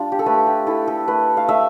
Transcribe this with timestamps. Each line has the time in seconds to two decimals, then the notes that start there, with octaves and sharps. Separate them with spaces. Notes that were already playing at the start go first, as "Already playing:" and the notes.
Already playing: G3 D4 F4
0.12 G4
0.19 A4
0.26 A3 B4
0.47 G4
0.67 E4 A4
0.87 A4
1.08 A3 B4
1.37 F5
1.49 A3 E5